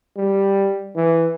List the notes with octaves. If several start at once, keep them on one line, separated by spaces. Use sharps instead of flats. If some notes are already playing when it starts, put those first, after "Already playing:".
G3
E3